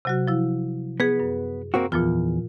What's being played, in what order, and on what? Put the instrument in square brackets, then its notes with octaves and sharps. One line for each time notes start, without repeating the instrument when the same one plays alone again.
[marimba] C3 F#3 F#4
F3 E4
[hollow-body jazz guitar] B3 [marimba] G#4 B4
[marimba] F#2
[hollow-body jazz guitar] A#3 C4 F#4
[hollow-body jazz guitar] E2 [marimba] A#2 F3 F4